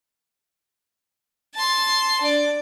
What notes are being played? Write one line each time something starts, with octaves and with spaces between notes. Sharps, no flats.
A5 C6
D4 D5